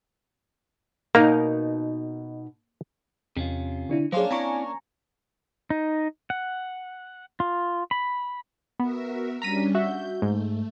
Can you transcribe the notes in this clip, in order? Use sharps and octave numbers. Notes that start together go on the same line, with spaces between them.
B2 A#3 D#4 A#4
E2 C3 C#4 F4
D3 D4 E4
F#3 A#3 C#4 D4 G#4 C5 C6
C4 E4 D5 G#5 A#5 C#6
D#4
F#5
F4
B5
B3 F#4 A#4 E5
G3 C#4 D4 A#5 B6 D#7
F#4 E5 G6
G#2 A3